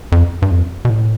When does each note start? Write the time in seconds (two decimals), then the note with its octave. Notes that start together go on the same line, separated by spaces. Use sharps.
0.12 F2
0.42 G2
0.51 F2
0.85 B2
0.90 A2